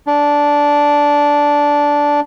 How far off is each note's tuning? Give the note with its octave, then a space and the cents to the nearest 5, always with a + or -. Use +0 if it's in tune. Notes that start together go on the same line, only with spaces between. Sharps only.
D4 -10